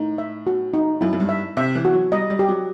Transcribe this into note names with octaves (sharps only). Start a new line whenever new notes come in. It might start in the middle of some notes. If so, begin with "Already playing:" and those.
Already playing: A2 D#4
E5
F#4
D#4
F#2 E4
F#2
G2
E5
C3 E5
E3
F#4
F#3
G3 D#5
G3
G4
F#3